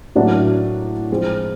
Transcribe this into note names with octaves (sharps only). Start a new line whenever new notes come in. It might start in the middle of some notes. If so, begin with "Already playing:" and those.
A2 F#3 A#3 D4 F#4
F3 G#3 C4